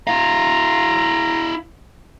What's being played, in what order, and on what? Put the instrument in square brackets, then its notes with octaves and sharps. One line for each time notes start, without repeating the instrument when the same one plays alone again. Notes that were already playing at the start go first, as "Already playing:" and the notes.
[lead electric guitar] E4 F5 [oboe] A#5